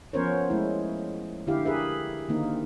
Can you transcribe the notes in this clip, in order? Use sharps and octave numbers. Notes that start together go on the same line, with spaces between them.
F3 B3 C#4 A#4 C5 C#5
G#3 A3 E4
D3 E4 G4 F5
G#4 A#4 B4 E5
D3 D#3 A#3 C4 D#4